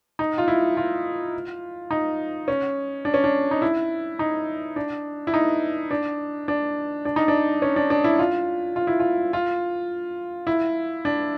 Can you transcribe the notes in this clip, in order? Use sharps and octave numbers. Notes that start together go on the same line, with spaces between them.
D#4
F4
E4
F4
D#4
C#4
D4
C#4
D4
D#4
E4
D#4
D4
E4
D#4
D4
D4
D4
D#4
D4
C#4
D4
D4
E4
F4
F4
E4
F4
F4
E4
D4